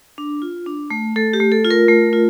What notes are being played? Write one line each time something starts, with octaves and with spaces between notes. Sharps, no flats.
D4
F4
D4
A3
A3 A4
G4
A3
A4
F4
A#4
A3
F4